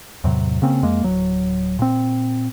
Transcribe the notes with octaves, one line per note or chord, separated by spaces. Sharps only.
E2 A2 C3 F#3
C#3 A#3 C4 C#4
F2 G#3 A#3
D1 F#3
A#2 C4